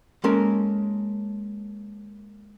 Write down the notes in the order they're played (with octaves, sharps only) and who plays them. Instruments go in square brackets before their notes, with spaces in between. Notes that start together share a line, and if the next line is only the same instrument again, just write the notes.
[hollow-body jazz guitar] G#3 A#3 C#4 A4 A#4